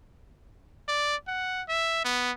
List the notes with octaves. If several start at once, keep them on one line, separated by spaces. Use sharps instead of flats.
D5
F#5
E5
B3